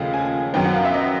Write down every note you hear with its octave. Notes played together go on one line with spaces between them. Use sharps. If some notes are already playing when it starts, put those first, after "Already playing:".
Already playing: D#2 C#3 F3 A3 F5
G#5
F#2 D#3 F#3 B3 G5
F#5
F5
E5
D#5